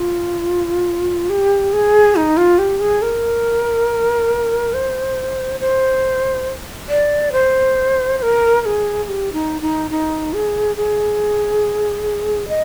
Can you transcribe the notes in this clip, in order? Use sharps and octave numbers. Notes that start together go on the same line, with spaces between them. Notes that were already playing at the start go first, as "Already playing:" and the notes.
Already playing: F4
G4
G#4
D#4
F4
G4
G#4
A#4
C5
C5
D5
C5
C5
A#4
A#4
G#4
G#4
G4
D#4
D#4
D#4
G#4
G#4
D#5